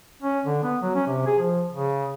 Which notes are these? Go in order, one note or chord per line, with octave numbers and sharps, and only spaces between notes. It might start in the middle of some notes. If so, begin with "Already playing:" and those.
C#4
D3
B3
F#3
C#4
C3
G#4
F3
C#3